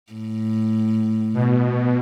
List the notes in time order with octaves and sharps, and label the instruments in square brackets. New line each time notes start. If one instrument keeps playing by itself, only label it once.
[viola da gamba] A2
[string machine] B2